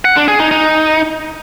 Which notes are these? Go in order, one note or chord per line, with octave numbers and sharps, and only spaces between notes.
F#5
D4
G#4
D#4
D#4